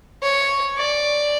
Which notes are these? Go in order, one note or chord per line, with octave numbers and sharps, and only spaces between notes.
C#5
D5